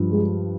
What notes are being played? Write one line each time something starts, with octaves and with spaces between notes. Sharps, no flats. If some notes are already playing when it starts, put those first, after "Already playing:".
Already playing: G2 F3
G#3